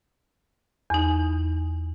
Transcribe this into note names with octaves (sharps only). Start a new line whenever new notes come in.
E2 D#4